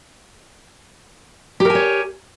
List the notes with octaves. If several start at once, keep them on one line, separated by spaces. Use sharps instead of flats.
G4 A#4 C#5 G#5